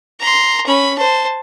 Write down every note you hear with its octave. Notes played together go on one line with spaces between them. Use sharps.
A#5 C6
C#4 B5
C5 A5